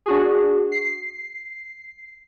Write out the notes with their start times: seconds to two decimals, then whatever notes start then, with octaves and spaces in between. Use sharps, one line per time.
0.06 D4 F#4 G#4
0.72 C7